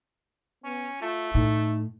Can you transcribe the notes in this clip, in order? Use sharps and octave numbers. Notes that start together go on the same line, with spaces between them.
B3 C#4
A3 F4
A2 D#4